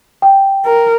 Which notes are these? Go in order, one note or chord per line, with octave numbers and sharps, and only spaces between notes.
G5
A#4